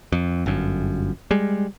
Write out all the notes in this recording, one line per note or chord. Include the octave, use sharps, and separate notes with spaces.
F2
G1 F#2
G3 G#3